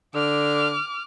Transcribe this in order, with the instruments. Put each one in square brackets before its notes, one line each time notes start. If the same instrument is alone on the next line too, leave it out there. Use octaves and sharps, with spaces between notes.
[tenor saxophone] D3 [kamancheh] D6 F6